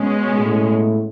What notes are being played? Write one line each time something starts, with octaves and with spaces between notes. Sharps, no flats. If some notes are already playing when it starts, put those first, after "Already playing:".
Already playing: B2 G#3 C#4
A2